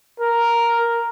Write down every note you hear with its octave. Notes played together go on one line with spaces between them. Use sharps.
A#4